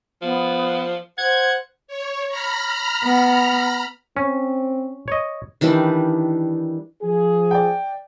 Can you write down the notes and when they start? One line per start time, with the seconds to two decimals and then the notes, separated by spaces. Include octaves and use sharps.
0.22 F3 B3
1.18 C5 F#5 G#6
1.87 C#5
2.28 A#5 B5 F6
3.04 B3
4.17 C4 C#4
5.08 C#5 D#5
5.61 D#3 E3 G3 D4
7.01 F3 G#4
7.51 D5 G5